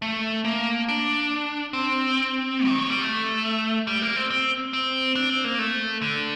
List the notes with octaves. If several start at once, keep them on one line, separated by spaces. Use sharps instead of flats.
A3
A#3
D4
C4
D#3
F#3
G3
A3
G3
A#3
C4
C4
C4
D4
C4
A#3
A3
D3